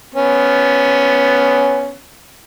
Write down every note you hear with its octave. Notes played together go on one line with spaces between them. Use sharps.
B3 C#4